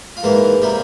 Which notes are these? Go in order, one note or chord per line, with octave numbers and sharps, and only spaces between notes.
F4
G#2 E3 A#3 E4
C3 G3 A#3